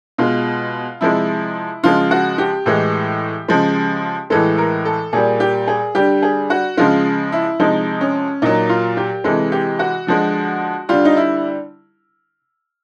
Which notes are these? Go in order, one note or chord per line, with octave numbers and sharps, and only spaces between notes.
B2 G#3 F4
C3 F3 G#3 E4
C#3 F3 G#3 F4
F#4
G4
A2 E3 G#3
C#3 F3 G#3
A2 E3 G#3 A4
A#4
A4
A#2 G3 G#4
G4
G#4
D3 G3 G4
G#4
F#4
C#3 F3 G#3 F4
E4
C3 F3 G#3 D#4
C#4
A#2 F#3 D#4
F4
G4
C3 E3 G#3 A4
G4
F#4
D3 F3 G#3
D3 G3 F4
D#4
E4